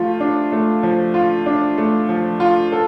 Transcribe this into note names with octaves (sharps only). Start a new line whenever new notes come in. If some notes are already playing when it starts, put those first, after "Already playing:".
Already playing: F3 A3 F4
D4
A3
F3
F4
D4
A3
F3
F4
A4